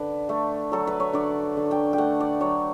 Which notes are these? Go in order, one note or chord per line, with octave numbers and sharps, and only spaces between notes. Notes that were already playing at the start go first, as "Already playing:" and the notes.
Already playing: D3 B4
A3
F#3 A4
B4
C#5
D3 D5
D3
G5
G5
A3 F#5
D5
F#3 C#5